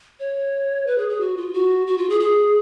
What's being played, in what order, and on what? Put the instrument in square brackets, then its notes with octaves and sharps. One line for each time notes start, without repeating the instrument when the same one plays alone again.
[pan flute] C#5
B4
G#4
G#4
F#4
F4
F#4
F#4
F4
G#4
G#4